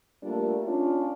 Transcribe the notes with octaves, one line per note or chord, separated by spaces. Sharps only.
G3 A3 A#3 D4 F4
C#4 D4 F4